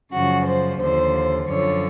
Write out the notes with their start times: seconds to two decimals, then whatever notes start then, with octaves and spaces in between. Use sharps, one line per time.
0.13 F#2 C#3 F3 F#4
0.47 C5
0.80 D#2 D3 F3 C5
1.48 F#2 D3 F3 C#5